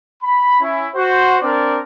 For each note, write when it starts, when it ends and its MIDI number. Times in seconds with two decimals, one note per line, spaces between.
0.23 0.59 83
0.61 0.89 61
0.61 0.89 64
0.95 1.38 66
0.95 1.38 72
1.42 1.80 60
1.42 1.80 62
1.42 1.80 70
1.42 1.80 74